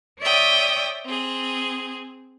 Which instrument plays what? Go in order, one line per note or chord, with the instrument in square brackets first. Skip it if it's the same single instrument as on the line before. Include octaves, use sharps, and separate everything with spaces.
[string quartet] C#5 D5 E5 G5 D#6
C4 G#4